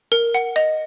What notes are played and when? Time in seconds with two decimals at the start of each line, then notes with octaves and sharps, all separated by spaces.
0.12 A#4
0.34 F#5
0.56 D#5